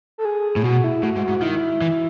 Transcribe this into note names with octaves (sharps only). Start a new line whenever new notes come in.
A4
G#4
A2
B2 F#4
E4
A2 F#4
G#2
F#4
G#2
D#3 E4
E3